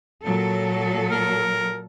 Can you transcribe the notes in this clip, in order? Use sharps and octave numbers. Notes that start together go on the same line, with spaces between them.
A#2 F#3 A4
A#4